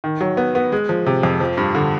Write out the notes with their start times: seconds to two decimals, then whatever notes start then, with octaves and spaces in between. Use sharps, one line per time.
0.04 D#3
0.21 F#3
0.37 B3
0.55 B3
0.72 G#3
0.89 F3
1.06 C3
1.23 F2
1.40 F3
1.58 G2
1.75 D3